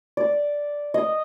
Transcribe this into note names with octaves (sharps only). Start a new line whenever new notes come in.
D5
D#5